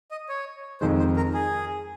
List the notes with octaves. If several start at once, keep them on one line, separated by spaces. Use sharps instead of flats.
D#5
C#5
F2 D#3 G#3 C5
C5
A#4
G#4